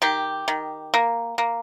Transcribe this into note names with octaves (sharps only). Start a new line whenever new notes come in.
D#3 G4
D#3
A#3
A#3